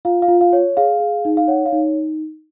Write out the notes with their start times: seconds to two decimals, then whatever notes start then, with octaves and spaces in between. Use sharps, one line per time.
0.05 F4 F5
0.22 F5
0.28 F4
0.41 F5
0.53 C#5
0.77 G#4 F5
1.00 G#4
1.25 D#4
1.37 F5
1.48 C#5 F#5
1.66 F5
1.72 D#4